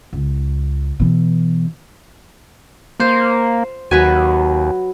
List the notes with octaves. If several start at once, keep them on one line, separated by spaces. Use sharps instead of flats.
C#2
B2 E3
A#3 F4 C5
D#2 F#3 F#4 B4 G#5